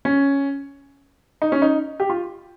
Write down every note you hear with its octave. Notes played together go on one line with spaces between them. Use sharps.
C#4
D#4
C#4
D#4
G4
F4